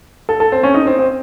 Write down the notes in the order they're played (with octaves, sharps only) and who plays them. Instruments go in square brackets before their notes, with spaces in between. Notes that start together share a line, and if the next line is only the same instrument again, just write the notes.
[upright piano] A4
A4
C4
C#4
D#4
C4
C4